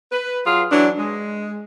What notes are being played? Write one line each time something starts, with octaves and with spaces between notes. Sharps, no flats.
B4
F#3 F4 G#4 F5
E3 F#3 D4
G#3